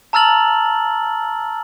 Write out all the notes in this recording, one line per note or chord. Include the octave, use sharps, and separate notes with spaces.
A5 A#5 E6 F6 A6 F#7